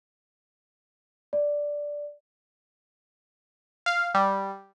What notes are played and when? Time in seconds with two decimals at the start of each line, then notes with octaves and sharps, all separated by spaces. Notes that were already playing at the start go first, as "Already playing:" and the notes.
1.33 D5
3.86 F5
4.14 G3